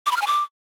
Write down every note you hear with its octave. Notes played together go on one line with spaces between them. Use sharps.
D6
B5
F6
G#5
D6